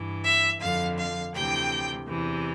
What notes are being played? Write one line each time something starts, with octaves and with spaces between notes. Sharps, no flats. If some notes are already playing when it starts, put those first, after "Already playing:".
Already playing: G2 E3
E5
F2 D3 F5
F5
D2 C3 E3 G5
E2 C3 E3